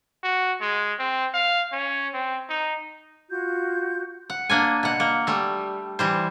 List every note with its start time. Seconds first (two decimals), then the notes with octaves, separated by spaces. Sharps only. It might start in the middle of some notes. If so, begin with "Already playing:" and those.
0.23 F#4
0.61 G#3
0.99 C4
1.34 F5
1.72 C#4
2.13 C4
2.49 D#4
3.29 F4 F#4 G6
4.30 F#5
4.49 A#3 D4 G#5
4.83 B2 F#5
5.00 A#3
5.27 G3 A3
5.99 E3 G3 C5